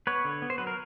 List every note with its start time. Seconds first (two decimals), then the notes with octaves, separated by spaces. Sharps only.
0.07 B3 B4 C#5
0.25 D3
0.42 B3
0.50 C5
0.58 F#3 B4
0.67 A#4